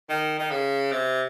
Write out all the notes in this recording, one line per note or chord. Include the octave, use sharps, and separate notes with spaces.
D#3
D#3
C#3
C3